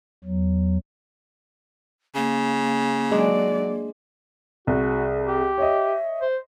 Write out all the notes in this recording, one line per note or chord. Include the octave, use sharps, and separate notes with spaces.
E2 F#3
C#3 A#3
F#3 G#3 D4 D5
C2 F#4 G#4
G4
C#5 D#5 E5
C5